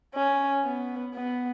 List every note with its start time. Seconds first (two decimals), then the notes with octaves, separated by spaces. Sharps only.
0.15 C#4
0.64 B3
1.14 B3